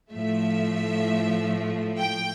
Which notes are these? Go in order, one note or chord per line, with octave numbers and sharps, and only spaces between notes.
A2 F3 A3 E5
G5